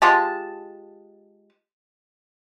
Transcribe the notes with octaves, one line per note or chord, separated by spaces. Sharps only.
G#3 F4 G4 A5